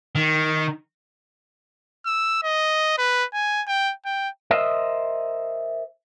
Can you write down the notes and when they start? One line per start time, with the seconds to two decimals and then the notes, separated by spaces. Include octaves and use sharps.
0.15 D#3
2.06 E6
2.43 D#5
2.98 B4
3.33 G#5
3.67 G5
4.05 G5
4.51 A#4 C5 D#5 E5